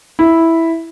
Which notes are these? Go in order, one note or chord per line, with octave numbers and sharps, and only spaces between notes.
E4